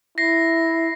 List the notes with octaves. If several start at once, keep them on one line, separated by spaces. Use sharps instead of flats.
E4 A#6 C7